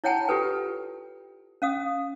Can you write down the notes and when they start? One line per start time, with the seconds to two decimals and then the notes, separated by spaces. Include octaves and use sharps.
0.04 E4 C#5 F#5 G5 A5 B5
0.28 F4 G4 A4 B4 G5
1.62 C#4 F5 D#6